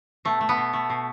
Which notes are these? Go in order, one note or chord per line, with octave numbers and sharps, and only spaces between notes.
B2 A3
A3
B3
B2
A3
B2